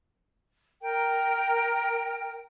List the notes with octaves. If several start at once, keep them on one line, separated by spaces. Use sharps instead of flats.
A#4 G5